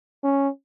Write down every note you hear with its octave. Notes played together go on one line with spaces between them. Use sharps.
C#4